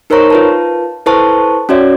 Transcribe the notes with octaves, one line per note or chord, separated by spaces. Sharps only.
D#4 A#4 C5 C#5 A#5 C#6
F4 B4 A5
E4 A4 B4 C5 A5 C#6
C#4 F#4 C#5 D5 E5